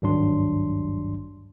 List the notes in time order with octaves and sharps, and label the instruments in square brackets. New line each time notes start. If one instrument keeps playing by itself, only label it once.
[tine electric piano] G#1 D2 G2 F#3 D4 C6